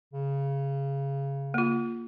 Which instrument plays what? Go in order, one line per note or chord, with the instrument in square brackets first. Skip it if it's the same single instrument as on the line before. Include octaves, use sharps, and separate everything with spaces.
[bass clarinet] C#3
[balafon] A#3 F4